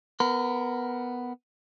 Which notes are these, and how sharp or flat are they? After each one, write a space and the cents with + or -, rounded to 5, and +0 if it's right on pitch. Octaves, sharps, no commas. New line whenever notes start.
B3 +5 A#4 +0 B5 +35